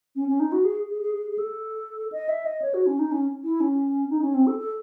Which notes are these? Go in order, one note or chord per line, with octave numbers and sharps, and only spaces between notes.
C#4
C#4
D#4
F#4
G#4
G#4
G#4
G#4
G#4
A4
D#5
E5
D#5
C#5
F#4
C#4
D#4
C#4
E4
C#4
D#4
C#4
C4
A4
A4